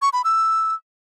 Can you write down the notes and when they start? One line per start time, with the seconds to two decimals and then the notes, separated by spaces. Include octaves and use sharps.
0.02 C#6
0.13 B5
0.24 E6